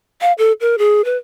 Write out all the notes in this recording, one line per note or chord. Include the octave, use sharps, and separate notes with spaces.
F5
A4
A#4
G#4
B4